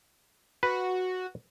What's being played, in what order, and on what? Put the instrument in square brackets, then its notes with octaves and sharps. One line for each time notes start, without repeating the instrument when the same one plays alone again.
[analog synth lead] F#4 [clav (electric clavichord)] B4